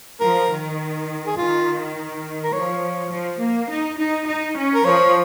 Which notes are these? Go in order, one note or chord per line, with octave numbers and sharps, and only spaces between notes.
F3 A#4
D#3
G#4
D#3 F4
A#4
F3 C#5
F3
A#3
D#4
D#4
D#4
C#4
A#4
F3 C#5